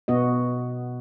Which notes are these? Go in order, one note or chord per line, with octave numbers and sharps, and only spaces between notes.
B2 B3 F#4 D#5